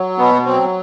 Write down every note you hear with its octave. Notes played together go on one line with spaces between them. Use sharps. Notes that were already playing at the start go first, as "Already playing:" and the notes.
Already playing: F#3
B2 B3
F#3 C4